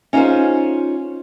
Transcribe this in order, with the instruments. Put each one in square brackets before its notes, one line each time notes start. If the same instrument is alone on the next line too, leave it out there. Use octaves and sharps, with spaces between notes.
[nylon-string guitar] C#4 D#4 F4 G#4 C5